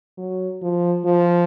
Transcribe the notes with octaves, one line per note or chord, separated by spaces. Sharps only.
F#3
F3
F3